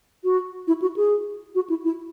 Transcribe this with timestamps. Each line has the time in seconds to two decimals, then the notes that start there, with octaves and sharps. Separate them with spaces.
0.24 F#4
0.67 E4
0.82 F#4
0.96 G#4
1.55 F#4
1.70 E4
1.84 E4